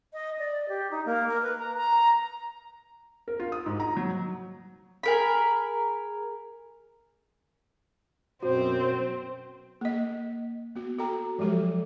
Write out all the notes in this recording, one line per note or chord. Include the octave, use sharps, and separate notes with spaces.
D#5
D5
G4
D#4
A#3
A#4
B4
A#5
A#5
A#4
F4
D#6
G#2
A#5
F#3
G#4 A#4 B5
F#2 B2 C4 F#4 C5
A#3 D#5
B3 F#4
F#4 A4 G5 A#5
F3 F#3 G#3 G4 A4